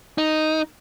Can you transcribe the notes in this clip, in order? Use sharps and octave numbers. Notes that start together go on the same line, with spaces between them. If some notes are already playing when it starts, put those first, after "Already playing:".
D#4